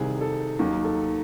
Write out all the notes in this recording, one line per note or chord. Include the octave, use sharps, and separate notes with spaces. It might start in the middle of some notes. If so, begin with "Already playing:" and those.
Already playing: C2 C3 D#3 G#4
A4
D#2 D#3 F#3
A4